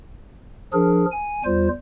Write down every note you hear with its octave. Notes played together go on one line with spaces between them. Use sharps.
F3 D4 G#4 A#4
G#5
E2 G3 F4 C5